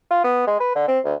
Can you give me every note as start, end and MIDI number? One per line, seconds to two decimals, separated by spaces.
0.11 0.22 65
0.24 0.46 59
0.47 0.59 56
0.60 0.75 71
0.76 0.83 50
0.88 0.99 60
1.05 1.14 38